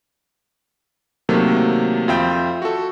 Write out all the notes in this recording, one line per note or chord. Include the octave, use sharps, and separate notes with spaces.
C3 D#3 F#3 A3 A#3
F2 F4 E5 G5 G6
F#4 A4